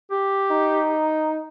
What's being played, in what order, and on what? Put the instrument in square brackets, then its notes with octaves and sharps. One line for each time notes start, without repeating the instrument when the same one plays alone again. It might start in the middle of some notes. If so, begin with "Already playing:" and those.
[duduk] G4
[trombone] D#4